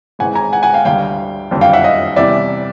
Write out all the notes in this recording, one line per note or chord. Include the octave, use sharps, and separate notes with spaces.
G#1 G#2 E3 G#3 F#5 G#5
G#5 A#5
F#5 G#5
F#5 G#5
F5 G5
D2 D3 G3 F5 G5
F#1 F2 D3 G3
F5 G5
E5 F#5
D#5 F5
E2 C3 E3 G3 D5 E5